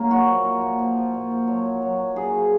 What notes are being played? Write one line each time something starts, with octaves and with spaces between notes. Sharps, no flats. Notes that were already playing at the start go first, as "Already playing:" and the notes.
Already playing: F#3 A#3
A#2 F#4
F3
F3
A#2
F3
F3
A#2
F3
F#3
F#3
F#3
F#3
C#3 G#4
F3